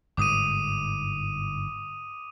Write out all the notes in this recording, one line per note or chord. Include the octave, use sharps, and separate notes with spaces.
G1 G#2 G#3 D6 D#6 D#7